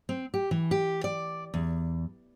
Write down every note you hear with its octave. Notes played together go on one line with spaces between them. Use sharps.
C4
G4
E3
G4
D5
E2